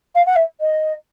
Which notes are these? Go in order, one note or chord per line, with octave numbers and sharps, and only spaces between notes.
F5
F#5
E5
D#5